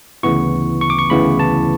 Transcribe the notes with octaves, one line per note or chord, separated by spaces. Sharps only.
D2 C#3 E3 B3 E4 C#6
C#6
D6
C#6
D2 C#3 E3 B3 E4 B5
A5